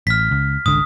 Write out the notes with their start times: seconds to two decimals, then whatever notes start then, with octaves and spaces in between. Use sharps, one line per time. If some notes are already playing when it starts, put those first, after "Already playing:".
0.07 A1 F6 B6
0.31 C#2
0.66 G#1 C#2 D3 D#6